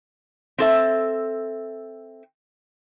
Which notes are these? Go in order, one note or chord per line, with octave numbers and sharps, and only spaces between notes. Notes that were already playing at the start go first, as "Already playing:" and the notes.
C4 A4 E5